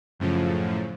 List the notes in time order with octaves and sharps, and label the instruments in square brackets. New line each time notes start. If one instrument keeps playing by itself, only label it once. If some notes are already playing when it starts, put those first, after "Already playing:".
[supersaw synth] F#2 A2 C#3 F3